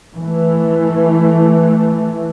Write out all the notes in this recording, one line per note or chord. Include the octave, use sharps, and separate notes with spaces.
E3 A3